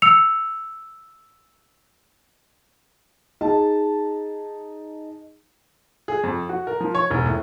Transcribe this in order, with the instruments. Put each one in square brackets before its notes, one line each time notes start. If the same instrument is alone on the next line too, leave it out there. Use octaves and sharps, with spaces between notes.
[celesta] E6 C#7 F7
[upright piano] D#4 G#4 A5
G#4
F2
F#4
A#4
F3
C#5
E1
A2